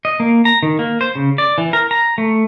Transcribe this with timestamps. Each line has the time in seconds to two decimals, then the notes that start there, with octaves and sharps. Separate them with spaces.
0.05 D#5
0.20 A#3
0.45 A#5
0.63 D#3
0.79 A#3
1.01 C5
1.15 C#3
1.38 D5
1.58 E3
1.73 A#4
1.91 A#5
2.18 A3